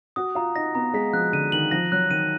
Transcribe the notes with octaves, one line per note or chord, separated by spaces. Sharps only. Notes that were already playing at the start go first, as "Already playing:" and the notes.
F#4 D#6
F4 A#5
D#4 A#6
B3 A#5
G#3 B6
F3 F#6
D3 D#7
D#3 F#7
F3 A#6
F#3 F#6
D#3 D#7